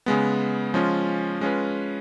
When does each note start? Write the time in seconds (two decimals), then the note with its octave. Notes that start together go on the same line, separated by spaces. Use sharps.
0.06 C#3 G#3 B3
0.74 F3 G#3 C#4 F4
1.41 G#3 C#4 F4 B4